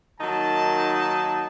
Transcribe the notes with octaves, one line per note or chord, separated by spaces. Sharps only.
D#3 F#3 A#3 D#4 A5